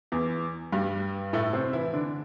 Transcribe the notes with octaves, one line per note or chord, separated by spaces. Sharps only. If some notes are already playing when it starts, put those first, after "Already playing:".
E2 E3
G2 G3
A2 A3
C3 C4
E3 E4
D3 D4